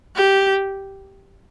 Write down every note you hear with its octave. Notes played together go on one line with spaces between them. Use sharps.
G4